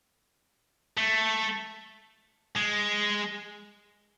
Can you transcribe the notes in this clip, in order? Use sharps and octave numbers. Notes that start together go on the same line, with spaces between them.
A3
G#3